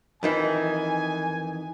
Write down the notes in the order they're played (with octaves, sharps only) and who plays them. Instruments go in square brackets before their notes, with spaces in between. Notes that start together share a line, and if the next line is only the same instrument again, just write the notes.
[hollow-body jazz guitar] F2 D#3 E3 [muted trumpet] G#5